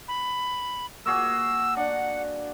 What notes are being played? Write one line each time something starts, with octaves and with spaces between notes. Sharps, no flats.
B5
A#3 F#4 G#4 E6
D4 F#5